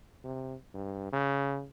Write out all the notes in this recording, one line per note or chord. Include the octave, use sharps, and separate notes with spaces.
C3
G2
C#3